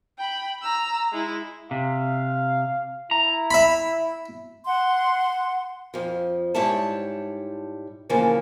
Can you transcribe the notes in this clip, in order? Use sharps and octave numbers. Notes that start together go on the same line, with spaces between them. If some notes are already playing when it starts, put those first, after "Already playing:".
G5 B5
A#5 E6
G#3 E4
C3 F5
E4 A#5
E5 B5
F#5 C6
F2 F3
G#2 G3 E4 C#5 A5
A2 C#3 E3 F3 A#3